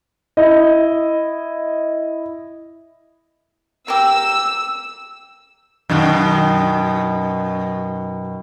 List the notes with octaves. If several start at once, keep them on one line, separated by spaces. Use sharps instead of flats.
E4 D#5
G4 A#4 E6
F#2 B2 D#3